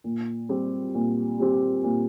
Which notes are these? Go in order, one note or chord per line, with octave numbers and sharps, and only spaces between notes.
A#2
G3 C4 G4
A#2
G3 C4 G4
A#2